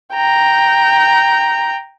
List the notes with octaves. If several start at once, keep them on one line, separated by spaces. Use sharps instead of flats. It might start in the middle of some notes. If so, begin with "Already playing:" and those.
G5 A#5